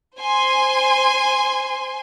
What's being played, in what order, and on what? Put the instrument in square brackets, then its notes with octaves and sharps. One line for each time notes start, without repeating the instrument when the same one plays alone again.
[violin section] C5 G#5 C6